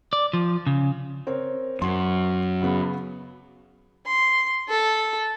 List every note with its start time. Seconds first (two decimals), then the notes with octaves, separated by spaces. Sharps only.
0.13 D5
0.33 F3
0.67 C#3
1.27 C4 A#4 C#5
1.82 F#2 C6
2.62 C#3 B3
4.08 C6
4.69 A4